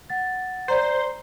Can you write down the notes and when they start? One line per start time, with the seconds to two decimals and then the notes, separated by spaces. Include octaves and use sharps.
0.10 F#5 A6
0.68 C5 D5 A#5 C6